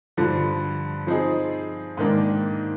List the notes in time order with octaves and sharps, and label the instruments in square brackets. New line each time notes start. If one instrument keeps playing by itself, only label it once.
[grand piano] G2 D3 F3
F3 C4 D#4 G#4
G#2 D#3 A#3 D4